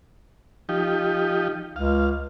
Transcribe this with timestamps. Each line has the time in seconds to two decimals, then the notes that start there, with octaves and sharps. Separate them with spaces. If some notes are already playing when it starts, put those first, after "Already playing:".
0.69 F3 D#4 G4
1.76 C#2 F5